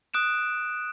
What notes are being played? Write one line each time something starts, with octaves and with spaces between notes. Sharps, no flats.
D#6 F#6 D7 E7